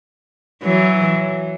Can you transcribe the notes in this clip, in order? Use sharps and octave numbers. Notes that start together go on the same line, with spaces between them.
E3 F#3